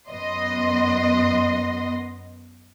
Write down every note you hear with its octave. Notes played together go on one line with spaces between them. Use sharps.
F#2 B3 D#5 C6